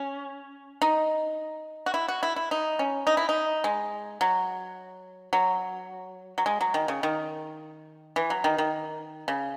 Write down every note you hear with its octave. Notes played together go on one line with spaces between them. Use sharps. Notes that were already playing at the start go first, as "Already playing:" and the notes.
Already playing: C#4
D#4
F#4
E4
F#4
E4
E4
D#4
C#4
D#4
E4
D#4
G#3
F#3
F#3
F#3
G#3
F#3
D#3
C#3
D#3
E3
F#3
D#3
D#3
C#3